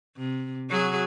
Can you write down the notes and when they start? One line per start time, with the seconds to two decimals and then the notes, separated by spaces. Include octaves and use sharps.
0.17 C3
0.70 F#3 F#4 G#4